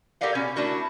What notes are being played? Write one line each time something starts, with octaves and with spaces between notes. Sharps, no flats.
G4 A4 A#4 D5 F5 F#5
B2 C#4
A3 D4 E4 F#4 A#4